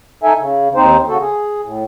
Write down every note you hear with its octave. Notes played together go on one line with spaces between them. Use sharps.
D#4 A4 E5 G#5
C#3
D#2 C4 D#4 C5
C#3 F#4 A4
G#4
A2